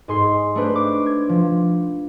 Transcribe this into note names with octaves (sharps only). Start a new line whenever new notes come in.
G#2 G#4 C6 C7
A3 D4 B4 C5
D6 D7
G#6
F3